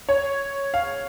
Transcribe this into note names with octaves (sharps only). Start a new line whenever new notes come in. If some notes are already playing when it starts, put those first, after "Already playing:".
C#5
F5